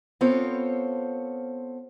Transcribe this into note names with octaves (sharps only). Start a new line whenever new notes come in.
B3 C4 F4 A4 C5 C#5